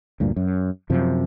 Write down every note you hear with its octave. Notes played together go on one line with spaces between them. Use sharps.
D2 G2 A#2
F#2
F#2 C3 F3